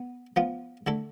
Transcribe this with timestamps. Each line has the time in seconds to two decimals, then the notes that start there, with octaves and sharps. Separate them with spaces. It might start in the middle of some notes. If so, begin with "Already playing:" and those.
Already playing: B3
0.36 F3 B3 F4
0.87 D3 A3 E4 A4